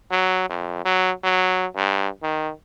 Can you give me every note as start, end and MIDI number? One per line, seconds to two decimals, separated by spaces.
0.11 0.47 54
0.50 0.82 41
0.85 1.12 54
1.24 1.67 54
1.76 2.09 43
2.23 2.51 51